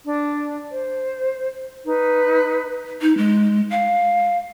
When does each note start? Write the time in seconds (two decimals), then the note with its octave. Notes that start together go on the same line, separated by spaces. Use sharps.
0.04 D4
0.70 C5
1.85 D#4 B4
3.02 D#4
3.18 G#3
3.71 F5